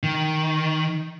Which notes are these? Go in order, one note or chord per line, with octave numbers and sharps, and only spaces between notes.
D#3